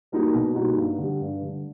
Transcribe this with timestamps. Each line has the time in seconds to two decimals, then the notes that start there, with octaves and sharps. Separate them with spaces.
0.12 G3 A#3 D#4 F#4
0.34 B2
0.55 G3 A#3 D#4 F#4
0.77 G2
0.98 D3 G3
1.21 G2
1.42 D3 G3